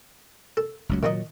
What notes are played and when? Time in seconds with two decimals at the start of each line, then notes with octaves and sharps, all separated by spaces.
0.57 A4
0.89 F#1 C#2 F#3
1.03 A#2 D#3 F3 F#3 D#4 D#5